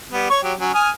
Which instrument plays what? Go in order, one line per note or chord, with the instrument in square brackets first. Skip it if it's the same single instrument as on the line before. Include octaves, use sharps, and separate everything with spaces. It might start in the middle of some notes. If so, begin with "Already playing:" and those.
[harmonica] G3 B3
C#5 C#6
F#3 G4
F#3 C#4
G#5 D#6 F6